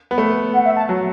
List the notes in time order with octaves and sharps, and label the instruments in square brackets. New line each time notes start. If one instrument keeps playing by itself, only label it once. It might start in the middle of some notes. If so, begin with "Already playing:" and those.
[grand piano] B3
A3
[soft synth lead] F#5
E5
A5
[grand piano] F#3